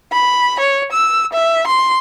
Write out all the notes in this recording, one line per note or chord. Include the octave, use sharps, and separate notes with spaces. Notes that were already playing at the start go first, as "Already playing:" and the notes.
B5
C#5
E6
E5
C6